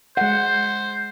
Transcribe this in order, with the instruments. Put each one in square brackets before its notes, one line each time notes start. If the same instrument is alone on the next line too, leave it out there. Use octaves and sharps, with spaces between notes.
[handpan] G#3 F#5 [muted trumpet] C5